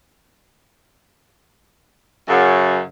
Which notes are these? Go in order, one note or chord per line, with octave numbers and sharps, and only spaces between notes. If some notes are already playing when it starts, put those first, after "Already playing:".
F#2 C#3